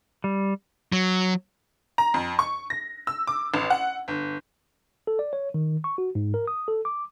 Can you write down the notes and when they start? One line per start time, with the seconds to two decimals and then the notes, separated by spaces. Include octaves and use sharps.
0.24 G3
0.92 F#3
1.98 A#5
2.14 F2
2.39 C#6
2.70 A#6
3.07 E6
3.27 D6
3.54 A1
3.70 F#5
4.08 G1
5.07 A4
5.19 D5
5.33 C#5
5.54 D#3
5.84 C#6
5.98 F#4
6.15 G#2
6.34 A#4
6.47 D#6
6.68 A4
6.85 D6